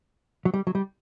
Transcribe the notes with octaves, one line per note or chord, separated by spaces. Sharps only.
F#3
G3
F#3
G3